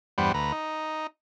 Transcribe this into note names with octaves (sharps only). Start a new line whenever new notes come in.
E2 G2 G3 B4 C5 F#5
D2 B4 A#5
D#4